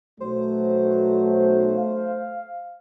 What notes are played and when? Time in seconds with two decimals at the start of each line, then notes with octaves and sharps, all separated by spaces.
0.20 B1 F#3 A3 C5
1.76 F5